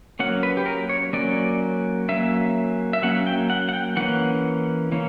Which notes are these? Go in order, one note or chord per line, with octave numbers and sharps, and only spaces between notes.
F#3 A#3 C#4 F#5
B4
G4
A#4
C#5
F#3 A#3 C#4 D5
F#3 A#3 C#4 E5
E5
F#3 A#3 C#4 F#5
G5
F#5
F#5
G5
E3 A#3 C#4 F#5
E3 A#3 C#4